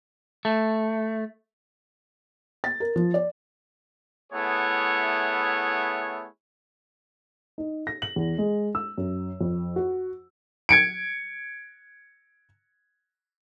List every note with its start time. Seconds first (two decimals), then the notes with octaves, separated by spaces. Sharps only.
0.45 A3
2.64 A6
2.80 A#4
2.96 F3
3.14 D5
4.32 A3 B3 E4 G#4 C#5 F#5
7.58 D#4
7.87 A#6
8.02 F#7
8.16 E2
8.38 G#3
8.75 E6
8.98 F#2
9.41 F2
9.76 F#4
10.69 G#6 C#7 D7